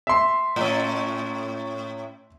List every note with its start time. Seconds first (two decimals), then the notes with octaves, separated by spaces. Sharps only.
0.07 E5 C6
0.56 A2 C#4